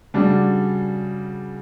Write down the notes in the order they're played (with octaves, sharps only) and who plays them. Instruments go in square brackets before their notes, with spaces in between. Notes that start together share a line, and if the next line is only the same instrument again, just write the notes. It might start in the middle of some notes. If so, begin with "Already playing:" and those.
[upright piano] C#3 G3 D4 F#4